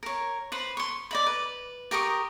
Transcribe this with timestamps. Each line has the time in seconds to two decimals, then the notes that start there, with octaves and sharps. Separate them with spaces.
0.03 A#4 C#5
0.52 B4 C5 B5
0.77 C6 C#6
1.11 D5 D#5 B5
1.26 B4
1.91 G4 A#4 C#6 D#6